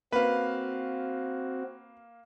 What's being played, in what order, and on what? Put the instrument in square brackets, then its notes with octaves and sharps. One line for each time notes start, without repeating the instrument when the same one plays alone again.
[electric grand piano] A#3 F5 [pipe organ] C4 F#4 [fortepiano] B4